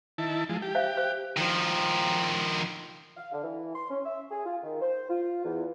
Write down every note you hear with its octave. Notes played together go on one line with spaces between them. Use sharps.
D#3 E4 A5
F3 G#3
G4
C5 E5 F5
C5
D#3 F3
F5
D3
E3
C6
C#4
E5
G#4
F4
D#3
C5
F4
E2